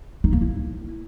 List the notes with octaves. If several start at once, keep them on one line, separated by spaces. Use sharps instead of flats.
D#4
A#3
E4